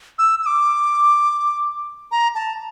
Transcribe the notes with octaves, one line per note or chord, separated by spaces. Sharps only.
E6
E6
D6
A#5
A5